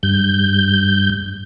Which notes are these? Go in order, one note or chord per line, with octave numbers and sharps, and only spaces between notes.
G2 G6